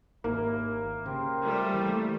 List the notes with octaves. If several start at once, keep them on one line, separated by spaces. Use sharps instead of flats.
G#1 D#2 A#3 E4
C#3 G4 A#4 C5
G3 A3
E3 C4